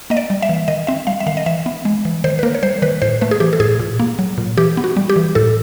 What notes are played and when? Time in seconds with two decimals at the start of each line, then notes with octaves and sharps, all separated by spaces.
0.10 A#3 D#5
0.17 D5
0.30 G3
0.42 E5
0.49 E3
0.68 D#3 D#5
0.87 C4 E5
1.07 G3 F5
1.20 E5
1.27 D#3 F5
1.37 D#5
1.46 E3 E5
1.66 B3
1.85 G#3
2.05 E3
2.24 D#3 C5
2.39 B4
2.43 A#3 A#4
2.54 C#5
2.63 G3 C5
2.82 D#3 B4
3.02 A2 C5
3.21 A3 B4
3.31 G#4
3.40 E3 G4
3.53 A4
3.60 A2 G#4
3.79 A#2
4.00 A#3
4.19 F#3
4.38 A#2
4.57 E3 G4
4.77 B3
4.84 F#4
4.97 G3
5.09 G4
5.16 E3
5.35 A2 A4